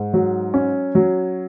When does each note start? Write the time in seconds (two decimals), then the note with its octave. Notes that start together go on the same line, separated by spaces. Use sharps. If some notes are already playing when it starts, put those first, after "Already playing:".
Already playing: G#2
0.14 F#3
0.54 C#4
0.95 F#3